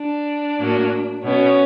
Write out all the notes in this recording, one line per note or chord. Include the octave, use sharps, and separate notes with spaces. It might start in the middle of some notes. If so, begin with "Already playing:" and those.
Already playing: D4
A2 F#3 A#3
B2 F#3 B3 C#4